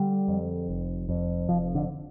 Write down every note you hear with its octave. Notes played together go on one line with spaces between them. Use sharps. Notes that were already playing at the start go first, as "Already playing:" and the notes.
Already playing: D3 G3
F2
F1
F2
F1 F3
D3